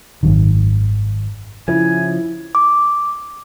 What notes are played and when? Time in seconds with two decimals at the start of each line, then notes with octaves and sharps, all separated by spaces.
0.23 G#1 F#2 D#3
1.68 C#3 F3 E4 G#5
2.55 D6